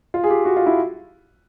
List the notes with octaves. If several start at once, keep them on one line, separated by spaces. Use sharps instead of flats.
F4
G#4
G4
F#4
F4
E4